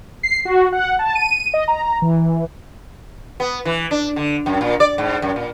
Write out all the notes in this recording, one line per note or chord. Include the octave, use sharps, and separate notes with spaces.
C7
F#4
F#5
A5
D#7
D#5
A#5
E3
B3
E3
D4
D3
F#2
A#2
D5
G#2
F#2
A#2